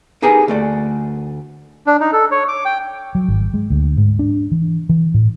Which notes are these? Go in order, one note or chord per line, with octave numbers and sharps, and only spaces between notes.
D#4 G4 G#4 A#4 B4
D2 A3 D5
D4
D#4
A4
C#5
D6
G5
F#3
G#1
G#3
D2
G#2
D4
E3
E3
A2